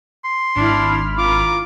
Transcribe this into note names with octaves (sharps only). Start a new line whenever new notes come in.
C6
G#1 D4 E4 B5 F6
F4 A#4 D6